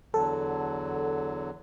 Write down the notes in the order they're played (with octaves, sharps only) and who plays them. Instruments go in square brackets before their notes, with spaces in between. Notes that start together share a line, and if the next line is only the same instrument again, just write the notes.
[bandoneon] E2 D3 F#3 [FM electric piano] A4